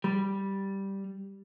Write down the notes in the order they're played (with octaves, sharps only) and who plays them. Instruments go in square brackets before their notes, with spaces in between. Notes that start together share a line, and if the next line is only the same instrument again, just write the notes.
[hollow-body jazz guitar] G3